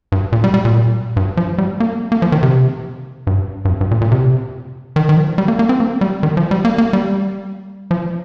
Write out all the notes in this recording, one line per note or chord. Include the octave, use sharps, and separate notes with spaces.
G2
A#2
G3
G3
A#2
G2
F3
G3
A#3
A#3
F3
D#3
C3
G2
G2
F2
G2
A#2
A#2
C3
D#3
D#3
F3
G3
A#3
A#3
C4
A#3
G3
D#3
F3
G3
A#3
A#3
G3
F3